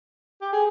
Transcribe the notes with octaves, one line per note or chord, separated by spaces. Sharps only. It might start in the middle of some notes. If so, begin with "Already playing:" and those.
G4
G#4